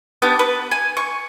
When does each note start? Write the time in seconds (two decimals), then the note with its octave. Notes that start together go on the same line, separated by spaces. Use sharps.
0.22 B3 D4 G4 D6
0.39 B4
0.71 G#5
0.97 C#6